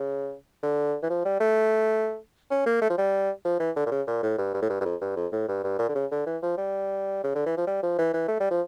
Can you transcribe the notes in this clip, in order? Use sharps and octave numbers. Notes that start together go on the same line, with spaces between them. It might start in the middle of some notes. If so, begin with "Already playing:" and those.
Already playing: C#3
D3
E3
F3
G3
A3
C#4
A#3
A3
F3
G3
F3
E3
D3
A#2
C#3
A#2
A2
G2
G2
A2
G2
G2
F2
G2
F2
A2
G2
G2
A#2
D3
C#3
D3
E3
F3
G3
C#3
D3
E3
F3
G3
F3
E3
E3
A3
G3
F3